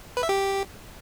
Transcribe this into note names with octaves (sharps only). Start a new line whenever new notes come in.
B4
E5
G4